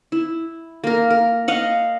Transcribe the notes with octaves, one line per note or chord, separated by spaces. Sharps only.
E4
A#3 A#4
A#4
D#5 F5 F#5